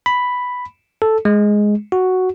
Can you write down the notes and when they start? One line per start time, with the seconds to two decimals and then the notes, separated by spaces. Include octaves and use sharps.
0.06 B5
1.02 A4
1.25 G#3
1.92 F#4